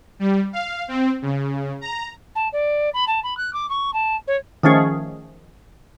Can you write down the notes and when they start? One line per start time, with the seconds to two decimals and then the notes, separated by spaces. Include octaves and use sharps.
0.19 G3
0.53 F5
0.88 C4
1.22 C#3
1.81 A#5
2.35 A5
2.53 D5
2.94 B5
3.07 A5
3.23 B5
3.37 F#6
3.53 D6
3.70 C#6
3.94 A5
4.27 C#5
4.63 D#3 F3 A3 C#4 G#4